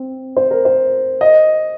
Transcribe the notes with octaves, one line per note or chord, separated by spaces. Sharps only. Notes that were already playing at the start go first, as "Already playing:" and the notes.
Already playing: C4
C5
A#4
C5
D#5